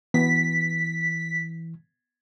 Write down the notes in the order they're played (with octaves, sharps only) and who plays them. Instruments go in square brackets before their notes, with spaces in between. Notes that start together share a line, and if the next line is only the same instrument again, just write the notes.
[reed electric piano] E3 [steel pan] B3 [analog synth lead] B6